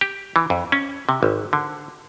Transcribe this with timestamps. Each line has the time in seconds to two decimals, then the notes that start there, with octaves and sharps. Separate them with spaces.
0.01 G4
0.36 E3
0.50 F2
0.72 C#4
1.09 C3
1.23 G#1
1.53 D3